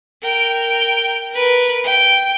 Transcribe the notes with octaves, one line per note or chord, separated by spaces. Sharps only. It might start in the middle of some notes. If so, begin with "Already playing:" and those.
A#4 G5
A#4 B4
G5